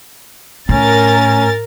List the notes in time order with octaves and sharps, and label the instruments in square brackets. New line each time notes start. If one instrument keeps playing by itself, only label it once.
[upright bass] A2 [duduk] C#4 [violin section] A#4 A6